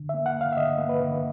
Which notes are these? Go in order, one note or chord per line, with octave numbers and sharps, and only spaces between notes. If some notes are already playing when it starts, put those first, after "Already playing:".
Already playing: D3
E5
A#3
F#5
D3 F5
E5
D3 D#5
A#3
B4
D3